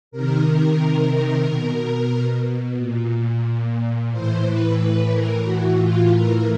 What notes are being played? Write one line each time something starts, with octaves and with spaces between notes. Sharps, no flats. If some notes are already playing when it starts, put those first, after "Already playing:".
C3 D#3 A#4
B2
A#2
A2 E3 C5
B4
B4
A#4
A2 E3 F#4
F4
A#4